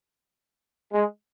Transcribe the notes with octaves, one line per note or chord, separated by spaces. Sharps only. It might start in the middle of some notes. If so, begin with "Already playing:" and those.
G#3